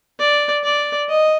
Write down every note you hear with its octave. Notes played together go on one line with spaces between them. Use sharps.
D5
D5
D#5